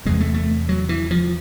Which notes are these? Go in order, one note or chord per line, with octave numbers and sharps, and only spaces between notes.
E2 C3 G#3
A3
A3
F#3
E3
F3